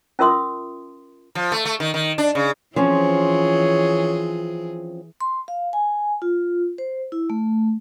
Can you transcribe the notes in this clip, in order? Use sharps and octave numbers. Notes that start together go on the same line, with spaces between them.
C#4 F4 A#4 E5 C6 D#6
F3
A3
A3
D#3
D#3
D4
C#3
E3 F3 C4 C#4 G#4 C#5
C6
F5
G#5
F4
C5
E4
A3